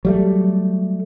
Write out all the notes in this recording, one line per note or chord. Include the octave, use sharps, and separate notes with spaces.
F#3 G3 A3